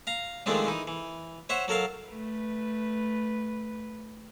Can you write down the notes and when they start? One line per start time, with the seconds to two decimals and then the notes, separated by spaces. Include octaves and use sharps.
0.07 F5 A#5
0.46 D#3 F3 G#3 A3 C4 D4
0.67 E3 D#4
0.87 E3
1.49 C5 C#5 E5 F#5 C#6
1.68 F#3 A4 A#4 F5
2.08 A3 B4